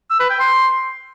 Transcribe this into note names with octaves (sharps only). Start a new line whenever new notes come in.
E6
B4
G5
C6